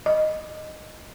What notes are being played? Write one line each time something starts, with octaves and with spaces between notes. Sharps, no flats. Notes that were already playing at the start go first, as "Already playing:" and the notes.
D#5